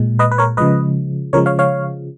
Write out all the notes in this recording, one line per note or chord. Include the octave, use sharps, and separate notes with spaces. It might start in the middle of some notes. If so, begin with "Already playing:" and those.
Already playing: A#2 G#3
B4 D#5
B4
A#4 C#5
C#3 F3 G#3 B4 D#5
C#3 F3 G#3 A#4 C#5
C#5 F5
C#5 F5